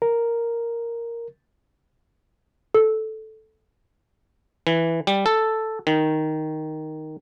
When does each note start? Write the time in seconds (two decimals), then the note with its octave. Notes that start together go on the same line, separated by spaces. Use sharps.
0.02 A#4
2.75 A4
4.67 E3
5.07 G3
5.26 A4
5.87 D#3